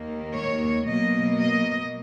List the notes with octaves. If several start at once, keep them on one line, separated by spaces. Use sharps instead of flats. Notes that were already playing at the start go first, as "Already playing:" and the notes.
Already playing: D#2 D#3 A#3
C#5
B2 F#3 A#3 D#5
D#5